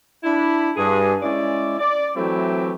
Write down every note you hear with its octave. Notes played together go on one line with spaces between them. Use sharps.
D4 E4 B5
G2 G#4
G#3 C#4 E4 D5
D5
E3 F#3 A3 C4 E4 G4